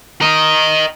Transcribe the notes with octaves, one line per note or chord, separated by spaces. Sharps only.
A#4 D#5